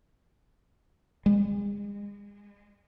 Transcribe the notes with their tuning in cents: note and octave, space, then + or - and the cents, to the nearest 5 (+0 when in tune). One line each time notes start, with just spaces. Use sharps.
G#3 -35